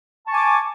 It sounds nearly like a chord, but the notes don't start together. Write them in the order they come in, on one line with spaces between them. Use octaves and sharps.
A5 C#6 G#5 D6